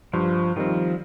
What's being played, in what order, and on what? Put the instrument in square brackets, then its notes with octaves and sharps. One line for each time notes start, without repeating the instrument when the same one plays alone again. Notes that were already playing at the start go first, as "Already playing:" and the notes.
[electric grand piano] G2 [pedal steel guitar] F3
[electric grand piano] D#3 G3 C4 [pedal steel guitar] F3